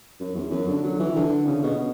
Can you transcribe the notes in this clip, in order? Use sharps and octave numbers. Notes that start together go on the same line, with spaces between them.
F#2
E2
F#2
D3
F#3
E3
D3
C#3
B2